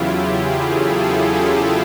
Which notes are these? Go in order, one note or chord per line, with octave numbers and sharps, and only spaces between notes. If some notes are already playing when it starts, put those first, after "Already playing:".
Already playing: E2 C#3 F#3 E4 F4 G4
G#4
A4
G#4
G4